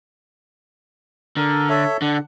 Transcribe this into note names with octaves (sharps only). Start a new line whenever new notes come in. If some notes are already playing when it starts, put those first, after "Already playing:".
D3 A#4
A4 C#5 E5
D3 D4 F#5